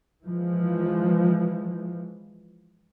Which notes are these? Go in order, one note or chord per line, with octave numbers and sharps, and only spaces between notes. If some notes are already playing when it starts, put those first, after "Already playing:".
E3 F3 G#3